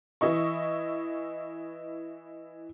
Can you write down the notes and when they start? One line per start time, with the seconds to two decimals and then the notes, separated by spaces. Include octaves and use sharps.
0.21 E3 E4 D#5 C#6